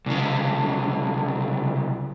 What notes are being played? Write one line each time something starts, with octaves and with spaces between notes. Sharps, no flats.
C2 C#3